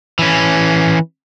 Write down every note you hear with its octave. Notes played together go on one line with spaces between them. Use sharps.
E3 C#4